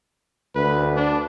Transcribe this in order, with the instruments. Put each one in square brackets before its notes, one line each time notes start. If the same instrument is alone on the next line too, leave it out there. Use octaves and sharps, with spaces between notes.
[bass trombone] D2 [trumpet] B4
[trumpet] D4